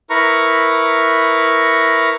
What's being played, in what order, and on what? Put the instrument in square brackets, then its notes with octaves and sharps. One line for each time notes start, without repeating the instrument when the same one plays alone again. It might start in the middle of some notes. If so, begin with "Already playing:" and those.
[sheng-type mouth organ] E4 A#4 B4 A#5 C#6